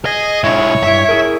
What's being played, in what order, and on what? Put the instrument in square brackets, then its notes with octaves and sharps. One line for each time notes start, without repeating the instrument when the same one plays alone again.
[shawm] G#4 [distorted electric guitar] D#5
[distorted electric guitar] B1 G#3 [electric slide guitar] E4 [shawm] C#5
[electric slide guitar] G2 E4 [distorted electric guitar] E5
[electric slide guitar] E4 G#4 A#4